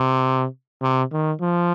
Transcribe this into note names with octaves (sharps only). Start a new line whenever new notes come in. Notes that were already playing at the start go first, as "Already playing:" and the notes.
Already playing: C3
C3
D#3
F3